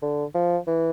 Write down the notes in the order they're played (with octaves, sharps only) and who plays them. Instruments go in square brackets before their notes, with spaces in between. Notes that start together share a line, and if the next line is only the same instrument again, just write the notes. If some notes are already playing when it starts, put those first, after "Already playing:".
[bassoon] D3
F3
E3